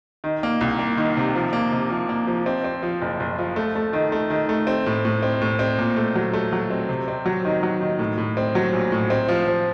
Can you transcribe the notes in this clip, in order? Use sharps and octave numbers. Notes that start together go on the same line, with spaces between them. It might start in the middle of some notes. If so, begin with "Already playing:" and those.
D#3
A#3
C2
A#3
D#3
C3
F3
A#3
C3
F3
A#3
F3
C4
C4
F3
F#1
F#1
F3
A3
A3
D#3
A3
D#3
A3
C4
A2
A2
C4
A2
C4
A#2
A3
F#3
A3
F#3
C4
C3
C4
F#3
D#3
F#3
D#3
A2
A2
C4
F#3
A#1
A2
C4
F3
F3